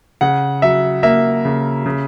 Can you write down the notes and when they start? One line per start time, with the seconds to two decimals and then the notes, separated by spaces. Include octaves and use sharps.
0.21 C#3 F#5
0.62 F#3 E5
1.03 A#3 E5
1.45 C#3
1.86 C#3